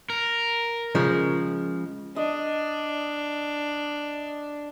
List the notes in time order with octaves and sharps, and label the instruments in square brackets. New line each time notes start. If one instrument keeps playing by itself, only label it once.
[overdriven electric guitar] A#4
[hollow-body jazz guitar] C#3 F3 G#3
[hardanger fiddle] D4 [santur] D#5